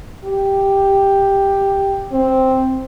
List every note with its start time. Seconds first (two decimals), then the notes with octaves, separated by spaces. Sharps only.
0.25 G4
2.12 C4